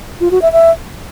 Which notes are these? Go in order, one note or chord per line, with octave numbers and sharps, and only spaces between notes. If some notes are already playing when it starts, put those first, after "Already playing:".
F4
F#4
E5
E5